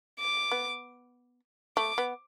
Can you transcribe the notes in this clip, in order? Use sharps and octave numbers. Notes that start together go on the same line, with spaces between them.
D6
B3
A3 D6
B3